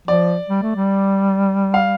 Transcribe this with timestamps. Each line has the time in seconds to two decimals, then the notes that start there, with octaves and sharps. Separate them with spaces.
0.08 F3 D5
0.49 G3
0.62 A3
0.76 G3
1.74 F5